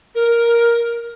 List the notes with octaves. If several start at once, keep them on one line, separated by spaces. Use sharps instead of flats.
A#4